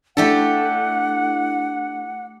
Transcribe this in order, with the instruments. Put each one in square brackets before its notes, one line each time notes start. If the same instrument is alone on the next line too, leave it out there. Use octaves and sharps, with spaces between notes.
[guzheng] A3 G4 A4 [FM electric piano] D4 E4 [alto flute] F#5